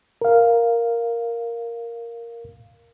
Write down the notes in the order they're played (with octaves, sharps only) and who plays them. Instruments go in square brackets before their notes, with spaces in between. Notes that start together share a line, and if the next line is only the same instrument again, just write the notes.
[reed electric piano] A#4 F5